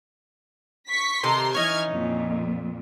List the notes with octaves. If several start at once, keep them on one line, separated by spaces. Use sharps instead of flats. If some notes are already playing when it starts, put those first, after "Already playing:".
C#6 B6
C3 D#3 A4 A#5 C6
E3 C#4 D#4 F6 G#6
F2 A#2